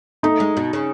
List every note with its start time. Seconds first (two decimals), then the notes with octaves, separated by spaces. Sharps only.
0.23 A3 D#4
0.40 G#3
0.57 B2
0.73 C#3